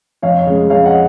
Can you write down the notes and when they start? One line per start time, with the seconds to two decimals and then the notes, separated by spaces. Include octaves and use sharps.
0.22 F2 C#5 F5
0.47 C#3 G#3
0.70 F2 C#5 F5
0.86 D#5 F#5